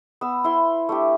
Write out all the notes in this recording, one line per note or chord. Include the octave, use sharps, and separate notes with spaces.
B3 E6
E4 C6
A3 D4 G4